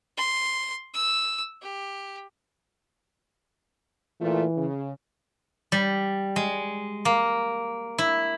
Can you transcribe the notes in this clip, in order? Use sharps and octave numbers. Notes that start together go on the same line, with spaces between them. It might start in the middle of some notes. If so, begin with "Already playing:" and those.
C6
E6
G4
A#2 E3 A3 F4
C#3
G3
G#3
A#3
E4